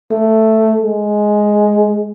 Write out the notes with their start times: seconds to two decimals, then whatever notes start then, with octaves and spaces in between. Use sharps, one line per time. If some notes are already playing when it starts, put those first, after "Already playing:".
0.11 A3
0.82 G#3